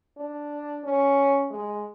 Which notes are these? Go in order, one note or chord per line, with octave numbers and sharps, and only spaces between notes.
D4
C#4
G#3